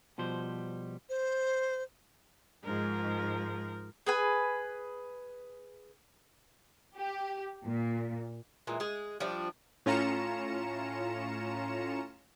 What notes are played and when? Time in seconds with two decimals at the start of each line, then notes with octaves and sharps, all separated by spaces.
0.18 B2 F3 G3 C5
1.09 C5
2.64 G#2 F3 A#4
4.06 G#4 B4 G#5
6.97 G4
7.65 A#2
8.67 A#2 E3 G#3
8.80 G#3 G#4
9.20 F3 G3 D4
9.86 A2 C#4 F4 A#5 C#7 E7